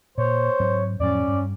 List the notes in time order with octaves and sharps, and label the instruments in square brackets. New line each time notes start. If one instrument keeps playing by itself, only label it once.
[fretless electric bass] A#2 [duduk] C5 [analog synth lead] C#5
[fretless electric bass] G#2 F#3 C4
[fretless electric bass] F2 A2 F#3 [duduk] C#4 [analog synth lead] D5
[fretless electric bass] G2 G3